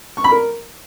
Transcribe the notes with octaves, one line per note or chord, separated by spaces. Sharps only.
C#6
B5
A#4